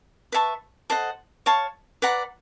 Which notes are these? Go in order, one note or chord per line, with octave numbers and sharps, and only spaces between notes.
B4 E5 A5 C#6
A4 C5 D#5 F#5
C#5 F5 A5 C#6
B4 D5 F#5 A#5